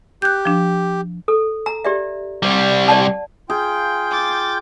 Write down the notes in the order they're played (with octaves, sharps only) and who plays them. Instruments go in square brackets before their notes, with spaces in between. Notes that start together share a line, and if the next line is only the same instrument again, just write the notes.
[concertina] G4 [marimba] F#6 G6
[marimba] F3 D4
[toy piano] A4
A#5
G4 D5 E5
[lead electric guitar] C2 G3
[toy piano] D5 F#5 A5
[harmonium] F4 G5 [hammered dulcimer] G#4 [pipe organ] G6
[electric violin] D6 A6